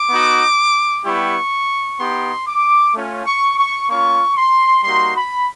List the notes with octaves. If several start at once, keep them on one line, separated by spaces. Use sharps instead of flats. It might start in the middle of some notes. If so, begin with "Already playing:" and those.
Already playing: D6
B3 D#4 F#4
G3 B3 E4 G4 C#6
B3 D#4 G4 C6
D6
A3 C#4 F4
C#6
C#6
A#3 C#4 F4 C#6
C6
G3 A#3 D#4 F#4 C6
B5